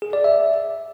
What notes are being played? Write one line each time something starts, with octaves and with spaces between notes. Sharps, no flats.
G#4
D5
E5